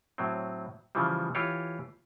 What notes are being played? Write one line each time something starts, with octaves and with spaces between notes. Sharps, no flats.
A2 F#3 C4
C#3 E3 F3 G3
E3 F4 G4 C#5